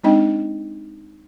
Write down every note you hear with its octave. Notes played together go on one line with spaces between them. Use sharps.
G#3 C4 D4 D#4 D#5 G5